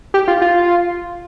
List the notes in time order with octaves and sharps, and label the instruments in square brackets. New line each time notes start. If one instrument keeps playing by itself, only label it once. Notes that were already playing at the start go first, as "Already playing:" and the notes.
[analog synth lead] G4
F4
F4